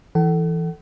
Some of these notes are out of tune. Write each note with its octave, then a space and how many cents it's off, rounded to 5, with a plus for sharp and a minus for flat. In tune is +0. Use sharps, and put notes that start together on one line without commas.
E3 +0 A4 +0 F#5 +40